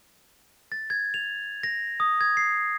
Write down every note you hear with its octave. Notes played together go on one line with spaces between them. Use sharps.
A6
G#6
F7
A#6
D#6
G#6
C7